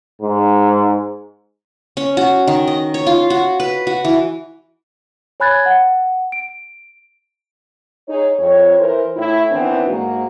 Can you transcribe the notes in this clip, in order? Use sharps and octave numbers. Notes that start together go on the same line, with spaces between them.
G#2
C#4
F#4
D#3
D#5
C#5
F4
F#4
B4
F#4
E3
C#5 G#5 B5 F#6 G#6 A6
F#5
D7
D#4 G#4 C#5
F2 C#5
E3 A#4 C5
A2 E4
D#3 E3 B3 C4 D4
G#2 A#3 F#4